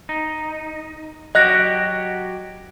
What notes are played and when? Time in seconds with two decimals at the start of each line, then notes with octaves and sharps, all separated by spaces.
0.09 D#4
1.35 F#3 F#4 G4 D#5 F#6 A#6